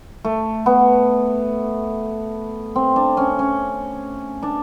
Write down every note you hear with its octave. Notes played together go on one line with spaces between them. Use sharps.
A3
B3
C4
D4
C#4
C#4
D4